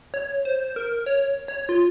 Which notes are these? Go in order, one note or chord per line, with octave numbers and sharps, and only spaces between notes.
C#5
C5
A#4
C#5
C#5
F4